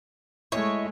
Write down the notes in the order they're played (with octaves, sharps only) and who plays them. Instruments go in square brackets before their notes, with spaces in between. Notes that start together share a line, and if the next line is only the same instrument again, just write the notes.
[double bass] G#3 A3 [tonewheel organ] E4 D#5 E5 [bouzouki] C#5